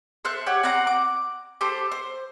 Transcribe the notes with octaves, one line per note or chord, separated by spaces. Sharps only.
A4 C5 E5 F#6
G4 C#5 F#5
C4 D5 F#5 A#5
D6
G4 A4 C5
C5